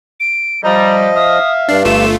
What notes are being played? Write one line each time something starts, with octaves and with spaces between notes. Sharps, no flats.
D7
F3 G3 D#5 A#5
E5 F5 D#6
G2 D4 C7
G1 A3 F4 E7